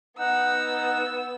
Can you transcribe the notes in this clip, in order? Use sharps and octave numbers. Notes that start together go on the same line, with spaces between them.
B3 D#4 F#5 E6